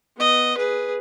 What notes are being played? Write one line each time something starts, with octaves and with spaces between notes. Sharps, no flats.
B3 D#5
G#4 B4